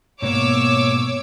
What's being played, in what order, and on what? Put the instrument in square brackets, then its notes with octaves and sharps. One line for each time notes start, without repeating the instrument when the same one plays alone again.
[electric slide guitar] G#2 B2 A#3 [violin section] C#5 D6 E6